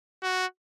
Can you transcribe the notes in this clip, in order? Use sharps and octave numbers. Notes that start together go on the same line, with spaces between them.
F#4